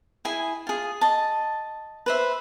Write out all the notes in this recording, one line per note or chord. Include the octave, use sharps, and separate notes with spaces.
E4 G#4 G#5
F4 G#4
D#5 A5
B4 C5 E5